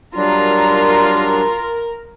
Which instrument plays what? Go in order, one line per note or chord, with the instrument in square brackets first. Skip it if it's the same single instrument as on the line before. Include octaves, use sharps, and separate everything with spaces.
[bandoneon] F#3 G3 D4 [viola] F4 [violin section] A#4